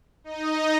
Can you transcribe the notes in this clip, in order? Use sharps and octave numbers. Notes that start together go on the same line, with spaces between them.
D#4 D#5